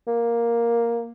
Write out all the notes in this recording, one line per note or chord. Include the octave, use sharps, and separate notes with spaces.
A#3